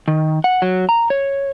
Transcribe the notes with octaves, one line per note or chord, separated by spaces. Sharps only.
D#3
F#5
F#3
A#5
C#5